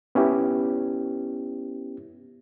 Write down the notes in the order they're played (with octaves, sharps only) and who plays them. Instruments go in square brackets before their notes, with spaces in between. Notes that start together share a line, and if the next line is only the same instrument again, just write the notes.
[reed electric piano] B3 C#4 E4 G4